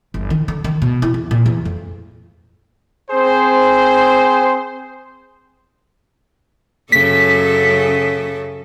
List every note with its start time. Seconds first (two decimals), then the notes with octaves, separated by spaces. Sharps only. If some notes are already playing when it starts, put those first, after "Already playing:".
0.14 G1
0.30 D#3
0.48 D3
0.64 D#3
0.82 B2
1.02 E4
1.14 E2
1.31 A#2
1.46 E2
1.65 F2
3.11 C4 G#4 C5
6.92 F#2 C#3 A4 B6